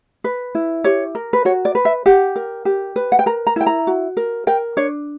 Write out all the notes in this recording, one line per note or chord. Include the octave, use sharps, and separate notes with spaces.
B4
E4
G4 C#5
A#4
B4
F#4 C#5
D5
B4
E5
G4 F#5
A#4
G4
B4
F#5
G5
A#4 A#5
A#5
E4 G5
A#5
F#4
A#4
A#4 G5
D4 C#5